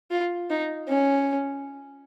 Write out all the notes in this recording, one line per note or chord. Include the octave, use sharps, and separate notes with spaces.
F4
D#4
C#4